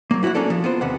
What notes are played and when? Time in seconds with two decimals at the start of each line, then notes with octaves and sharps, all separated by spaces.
0.11 F#3 A#3
0.23 E4 F#4 C5 C#5 F#5
0.35 A#3 C#4 D4 A4 D5
0.50 F3
0.64 B3 F4 C5
0.81 D#2 C3 B3 F#5